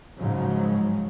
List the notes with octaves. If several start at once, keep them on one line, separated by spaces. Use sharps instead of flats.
G#2 C#3 F3 F#3 G#3